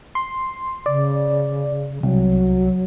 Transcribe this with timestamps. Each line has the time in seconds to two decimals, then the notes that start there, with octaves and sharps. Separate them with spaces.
0.15 C6
0.86 C#3 D5
2.03 C2 F#3